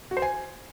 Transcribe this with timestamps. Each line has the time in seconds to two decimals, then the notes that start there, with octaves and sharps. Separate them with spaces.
0.11 F#4
0.17 C5
0.22 G#5